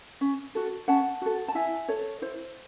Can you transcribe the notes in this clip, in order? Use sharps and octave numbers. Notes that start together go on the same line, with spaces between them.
C#4
F#4 A4
C#4 F#5 A5
F#4 A4
A5
E4 E5 G#5
A4 C#5
E4 C5